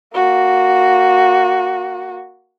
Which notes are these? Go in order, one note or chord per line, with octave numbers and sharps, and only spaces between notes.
A#3 F#4